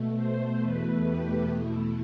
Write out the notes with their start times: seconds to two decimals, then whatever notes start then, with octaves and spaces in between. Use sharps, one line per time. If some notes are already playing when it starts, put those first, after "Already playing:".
Already playing: B2 A3
0.15 C5
0.60 E2 B2 A3 B4
1.04 G4
1.49 E2 B2 A3 E4